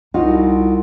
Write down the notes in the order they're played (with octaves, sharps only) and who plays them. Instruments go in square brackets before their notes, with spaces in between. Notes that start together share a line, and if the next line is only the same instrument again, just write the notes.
[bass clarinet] C2 [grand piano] D#4 F#4 [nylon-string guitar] F4